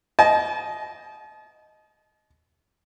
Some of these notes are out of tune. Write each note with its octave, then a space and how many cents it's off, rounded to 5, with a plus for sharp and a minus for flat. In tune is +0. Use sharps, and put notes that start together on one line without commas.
D#5 +0 A5 -40